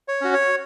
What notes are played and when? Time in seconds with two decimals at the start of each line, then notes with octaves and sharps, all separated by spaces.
0.08 C#5
0.21 C#4 F#4
0.34 C#5